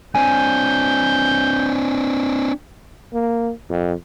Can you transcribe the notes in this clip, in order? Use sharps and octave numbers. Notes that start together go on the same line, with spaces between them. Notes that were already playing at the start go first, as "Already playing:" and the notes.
C4 D4 G#5 G6
A#3
F2